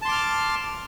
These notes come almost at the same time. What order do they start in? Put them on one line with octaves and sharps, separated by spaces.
A5 C6 D6 F6